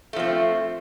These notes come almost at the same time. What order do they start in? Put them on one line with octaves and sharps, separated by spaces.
A3 F3 C4